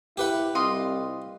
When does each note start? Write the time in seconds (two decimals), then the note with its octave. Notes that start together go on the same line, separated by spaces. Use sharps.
0.17 E4 G4 B4 F#5
0.55 C2 F4 D#5 C6